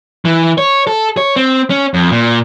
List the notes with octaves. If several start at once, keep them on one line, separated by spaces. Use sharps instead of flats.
E3
C#5
A4
C#5
C4
C#4
F2
A#2